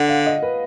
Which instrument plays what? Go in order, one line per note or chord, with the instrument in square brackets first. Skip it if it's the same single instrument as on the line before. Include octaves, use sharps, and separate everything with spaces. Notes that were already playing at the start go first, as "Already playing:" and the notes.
Already playing: [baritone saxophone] D3 [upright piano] F#5
[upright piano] F5
D#5
B4